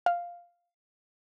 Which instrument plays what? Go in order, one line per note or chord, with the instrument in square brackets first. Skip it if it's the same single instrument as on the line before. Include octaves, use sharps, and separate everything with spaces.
[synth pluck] F5